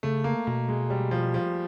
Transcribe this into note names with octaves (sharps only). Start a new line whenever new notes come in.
C#3 A3
A#3
B2 A#3
G#3
G3
F3
F3